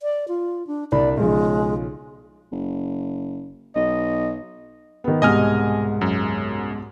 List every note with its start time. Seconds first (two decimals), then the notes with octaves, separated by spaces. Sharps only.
0.01 D5
0.28 F4
0.67 D4
0.92 C2 D4 D5 B5
1.17 B1 C#3 F3 G#3
2.52 F#1
3.76 B1 D#5
5.04 D#3 B3
5.22 C2 G#2 B2 D#5 G#5 F6
6.01 F#2